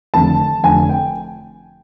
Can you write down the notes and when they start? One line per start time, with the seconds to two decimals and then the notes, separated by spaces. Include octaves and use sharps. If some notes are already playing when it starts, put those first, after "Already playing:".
0.14 F1 F2 D3 A5
0.63 F1 F2 D3 G#5
0.89 G5